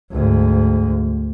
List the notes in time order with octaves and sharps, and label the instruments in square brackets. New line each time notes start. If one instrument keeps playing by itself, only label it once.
[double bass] D2 G#2